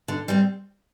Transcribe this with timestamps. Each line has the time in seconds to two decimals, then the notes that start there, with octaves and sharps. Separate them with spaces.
0.08 D3
0.28 G3 C4